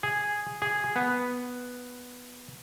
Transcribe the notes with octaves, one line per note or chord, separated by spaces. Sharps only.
G#4
G#4
B3